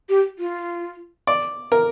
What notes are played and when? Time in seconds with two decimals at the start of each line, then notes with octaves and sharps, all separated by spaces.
0.09 G4
0.39 F4
1.27 D5
1.72 A#4